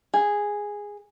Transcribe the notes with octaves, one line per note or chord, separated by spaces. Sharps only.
G#4